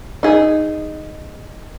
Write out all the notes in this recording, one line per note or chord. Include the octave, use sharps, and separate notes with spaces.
D#4 G#4